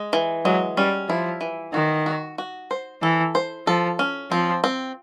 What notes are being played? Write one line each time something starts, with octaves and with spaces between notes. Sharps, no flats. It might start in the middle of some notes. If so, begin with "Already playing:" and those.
Already playing: G#3
E3
F#3 G#3
G3 C#4
F3 E4
E3
D#3 F#4
F#4
F#4
C5
E3 A4
C5
F3 A4
C#4
F3 C4
C4